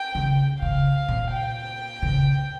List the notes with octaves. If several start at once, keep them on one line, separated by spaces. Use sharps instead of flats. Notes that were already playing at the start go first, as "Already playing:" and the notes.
Already playing: G5
C#3
C#3 F5
A#2
G5
C#3